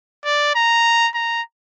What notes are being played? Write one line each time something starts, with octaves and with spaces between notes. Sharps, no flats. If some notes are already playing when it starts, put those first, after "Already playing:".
D5
A#5
A#5